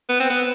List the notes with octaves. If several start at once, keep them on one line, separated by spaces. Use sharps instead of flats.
B3
C4
B3